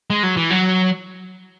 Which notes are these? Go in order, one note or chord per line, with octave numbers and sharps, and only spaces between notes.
G#3
F#3
E3
F#3